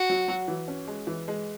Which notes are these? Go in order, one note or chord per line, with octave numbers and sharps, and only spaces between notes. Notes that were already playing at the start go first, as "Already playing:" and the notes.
Already playing: F#4
F#3
F#3
E3
C#4
G#3
E3
G#3